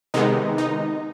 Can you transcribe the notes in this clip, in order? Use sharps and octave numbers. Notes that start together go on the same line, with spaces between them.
C3 D#3 G#3 B3 D#4
D#4